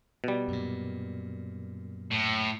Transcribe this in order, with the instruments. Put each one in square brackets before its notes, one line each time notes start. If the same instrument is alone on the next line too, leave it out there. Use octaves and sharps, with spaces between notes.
[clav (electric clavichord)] B2 G3
[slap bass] F#2 A#2
[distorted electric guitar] A2